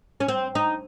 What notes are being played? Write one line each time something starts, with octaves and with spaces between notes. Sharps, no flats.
C#4
C4
D#4